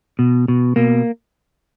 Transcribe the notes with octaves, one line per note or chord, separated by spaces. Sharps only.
B2
B2
B2 A#3